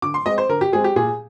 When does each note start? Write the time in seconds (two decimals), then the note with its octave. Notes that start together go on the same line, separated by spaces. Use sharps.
0.02 D3 D6
0.14 C6
0.26 G#3 C4 D#5
0.38 C5
0.49 D3 A#4
0.61 G4
0.72 G#3 C4 G#4
0.84 G4
0.96 A#2 G#4